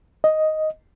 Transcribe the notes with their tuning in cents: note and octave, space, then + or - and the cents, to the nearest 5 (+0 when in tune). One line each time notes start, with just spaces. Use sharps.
D#5 +5